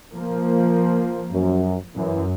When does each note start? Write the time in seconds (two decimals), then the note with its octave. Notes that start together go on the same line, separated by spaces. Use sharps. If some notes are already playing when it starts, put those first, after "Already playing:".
0.12 F3 A#3
1.31 F#2
1.97 F#2 E3